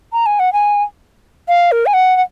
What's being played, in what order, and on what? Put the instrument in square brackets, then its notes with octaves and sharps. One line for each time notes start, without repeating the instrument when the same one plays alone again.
[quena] A#5
G#5
F#5
G#5
F5
A#4
G#5
F#5
F#5